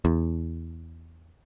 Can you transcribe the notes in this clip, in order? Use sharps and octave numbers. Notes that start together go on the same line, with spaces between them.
E2